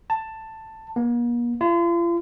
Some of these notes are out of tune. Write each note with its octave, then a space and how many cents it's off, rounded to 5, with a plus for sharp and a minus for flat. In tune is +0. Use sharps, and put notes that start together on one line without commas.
A5 +10
A#3 +40
F4 -40